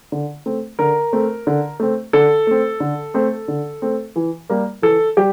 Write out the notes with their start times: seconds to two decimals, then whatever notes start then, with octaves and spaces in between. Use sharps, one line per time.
0.12 D3
0.46 A3 C4
0.79 D3 A#4
1.13 A3 C4
1.47 D3
1.80 A3 C4
2.13 D3 A4
2.47 A3 C4
2.80 D3
3.14 A3 C4
3.48 D3
3.82 A3 C4
4.16 E3
4.49 G3 A#3
4.82 E3 A4
5.17 G3 G4